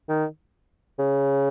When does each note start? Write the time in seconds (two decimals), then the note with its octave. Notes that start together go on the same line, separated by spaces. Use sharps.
0.09 D#3
0.99 C#3